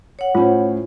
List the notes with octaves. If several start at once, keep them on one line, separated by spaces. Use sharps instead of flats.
C#5 F#5
A2 C#4 F4 C5